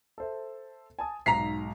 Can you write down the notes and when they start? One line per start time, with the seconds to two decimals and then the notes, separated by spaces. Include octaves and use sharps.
0.18 A4 C5 E5
0.99 G#5 A5 D#6
1.26 B1 G#2 A#5 B6 C7 F7